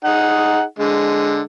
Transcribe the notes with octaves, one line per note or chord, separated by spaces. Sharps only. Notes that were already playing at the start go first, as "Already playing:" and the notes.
D#4 G#4 F#5
D3 G#3